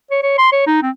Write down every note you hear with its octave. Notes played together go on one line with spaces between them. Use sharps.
C#5
C#5
C6
C#5
D#4
C4